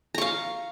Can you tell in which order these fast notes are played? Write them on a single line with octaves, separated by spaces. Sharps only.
A#5 C#6 F5